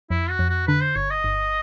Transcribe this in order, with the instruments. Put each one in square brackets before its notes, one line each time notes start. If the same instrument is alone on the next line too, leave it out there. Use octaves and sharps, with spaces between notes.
[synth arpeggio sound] F2 [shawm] E4
[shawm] F#4
[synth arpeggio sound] F2
[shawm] F#4
[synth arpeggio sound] D3 [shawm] B4
[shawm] C5
[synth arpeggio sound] G1 [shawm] C#5
[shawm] D#5
[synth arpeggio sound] G1